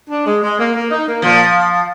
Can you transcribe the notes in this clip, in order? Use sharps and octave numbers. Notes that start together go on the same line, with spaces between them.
D4
G#3
G#3
A#3
A#3
D#4
A#3
A#2 F3